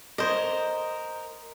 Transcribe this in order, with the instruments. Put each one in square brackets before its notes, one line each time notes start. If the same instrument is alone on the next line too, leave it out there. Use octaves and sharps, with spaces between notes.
[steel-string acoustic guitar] A#4 [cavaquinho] C5 D#5